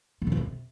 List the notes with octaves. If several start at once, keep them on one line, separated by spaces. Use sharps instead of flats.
G#2
A#2
F2
C3